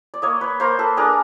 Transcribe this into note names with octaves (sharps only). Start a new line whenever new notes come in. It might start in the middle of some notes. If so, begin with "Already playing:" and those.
D5
A#3 C#5 D#5
B4 C#5
A#3 A#4 C5
A4 B4
D4 G#4 A#4